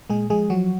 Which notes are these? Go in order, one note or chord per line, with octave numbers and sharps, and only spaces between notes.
A#2 G#3 G#4
F3 G#3 G#4
F3 F#3 F#4